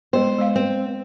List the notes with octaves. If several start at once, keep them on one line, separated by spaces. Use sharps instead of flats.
G#3 B3 C5
G#3 F5
C4